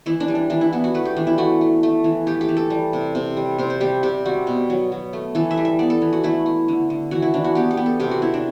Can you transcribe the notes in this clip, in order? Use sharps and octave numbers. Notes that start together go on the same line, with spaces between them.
E3 E4
D4
G3
D4
E3 D4
E4
B3 E4
F#4
A3 B4
G4
E3 D4
E4
A3 F#4
A3
A3
E3
A3 G4
G4
E3
A4
G3
C3
C3
G3
C3 C5
C5
G3 G4
C3 G4
G3 F#4
B2
F#3
F#3
A3
E3 A4
E5
G3
E5
B3 D5
A4
E3
F#4
A3 E4
A3
D3
D3
E3 F#4
E4
E3 D4
F#4
B3 G4
G4
B3
A4
C3 G4
F#4
C3 E4
D4